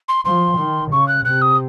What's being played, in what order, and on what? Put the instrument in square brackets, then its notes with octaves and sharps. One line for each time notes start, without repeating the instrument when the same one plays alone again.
[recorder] C6
[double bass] F3 [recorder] C6
[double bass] D#3
[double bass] C#3 [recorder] C#6
[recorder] F#6
[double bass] C3 [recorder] F#6
[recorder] D#6